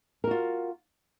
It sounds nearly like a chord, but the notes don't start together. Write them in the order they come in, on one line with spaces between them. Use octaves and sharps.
A#4 F#4 F4